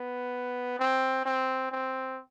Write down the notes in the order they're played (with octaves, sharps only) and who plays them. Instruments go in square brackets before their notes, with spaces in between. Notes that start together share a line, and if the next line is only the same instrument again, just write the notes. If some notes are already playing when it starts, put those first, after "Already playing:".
Already playing: [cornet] B3
C4
C4
C4